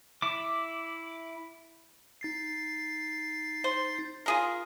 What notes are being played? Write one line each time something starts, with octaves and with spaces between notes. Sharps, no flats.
E4 D6
D#4 A6 C7
C5
F4 G#4 A#4